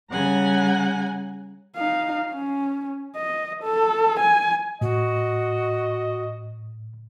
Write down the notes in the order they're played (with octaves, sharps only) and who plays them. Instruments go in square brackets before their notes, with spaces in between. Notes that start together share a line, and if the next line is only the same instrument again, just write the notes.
[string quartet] C#3 G3 F#5 G#5 A#5
[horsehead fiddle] D#4 F5
C#4
D#5
A4
G#5
[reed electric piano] A2 [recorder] F#4 [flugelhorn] D#5